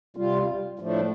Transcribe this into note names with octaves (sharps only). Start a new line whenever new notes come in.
C3 G3 F4
A2 F3 A3 D4